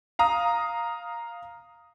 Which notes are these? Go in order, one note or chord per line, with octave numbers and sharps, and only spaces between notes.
F5 A#5 D#6